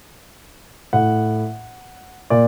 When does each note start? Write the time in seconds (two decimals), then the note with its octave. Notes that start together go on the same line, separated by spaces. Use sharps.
0.93 A2 F#5
2.30 A#2 D5